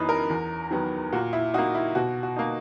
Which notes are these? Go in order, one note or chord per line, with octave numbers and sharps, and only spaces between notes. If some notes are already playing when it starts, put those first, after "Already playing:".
Already playing: F#2 E3 B3 D#4 B4
A#4
E2
D#3 F#3 B3
A#2 F#4
E4
A#3 D#4 F#4
E4
B2 F#4
F#4
A#3 D#4